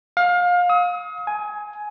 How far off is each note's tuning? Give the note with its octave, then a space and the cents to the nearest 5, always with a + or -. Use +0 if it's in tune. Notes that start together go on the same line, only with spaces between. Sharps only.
F5 +25
D#6 +40
G#5 +10